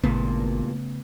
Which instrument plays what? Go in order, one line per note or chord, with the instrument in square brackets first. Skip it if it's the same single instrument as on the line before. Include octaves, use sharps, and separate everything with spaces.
[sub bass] G#1 [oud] E2 G2 A#2 [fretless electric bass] C#3 A3 B3